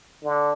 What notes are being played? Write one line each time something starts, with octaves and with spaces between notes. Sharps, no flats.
D3